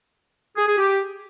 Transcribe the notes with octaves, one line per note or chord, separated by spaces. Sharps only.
G#4
G#4
G4